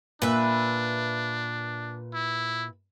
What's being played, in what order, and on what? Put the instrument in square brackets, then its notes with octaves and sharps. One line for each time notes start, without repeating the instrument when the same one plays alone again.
[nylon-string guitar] A#2 [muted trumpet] D4 [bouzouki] B4 E5
[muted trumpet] E4